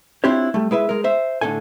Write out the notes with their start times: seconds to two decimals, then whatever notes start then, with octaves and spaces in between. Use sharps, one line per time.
0.24 C4 D4 E4 F4 G4 C#5
0.54 G3 A3
0.71 G#3 E4 B4 E5
0.89 G#3 A#4
1.04 C5 E5
1.41 A2 D3 C#4 A4 G#5